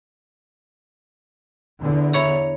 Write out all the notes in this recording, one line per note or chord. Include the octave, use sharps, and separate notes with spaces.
E2 D3
E4 C#5 A#5